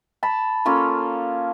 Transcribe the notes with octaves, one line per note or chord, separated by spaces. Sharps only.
A5 B5
A#3 C#4 F4 A4